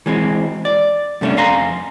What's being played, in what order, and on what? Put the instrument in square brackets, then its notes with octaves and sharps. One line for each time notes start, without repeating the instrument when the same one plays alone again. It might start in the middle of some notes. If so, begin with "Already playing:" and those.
[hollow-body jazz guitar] E3 G#3 C4
D5
G2 C3 A3 C#4 D4
F2 B4 F5 G#5 A#5 C6